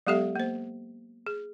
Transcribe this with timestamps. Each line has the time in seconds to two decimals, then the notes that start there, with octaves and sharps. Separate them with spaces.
0.07 F#3 G#3 B3 G4 A4 E5
0.36 A#3 C5
1.27 G#4